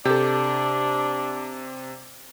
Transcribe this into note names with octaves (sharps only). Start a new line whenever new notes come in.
C3 D4 G4 A4